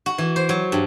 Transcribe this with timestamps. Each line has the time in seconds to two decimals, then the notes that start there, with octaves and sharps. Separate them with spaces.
0.06 F#4
0.18 E3
0.36 C5
0.49 F#3
0.72 G2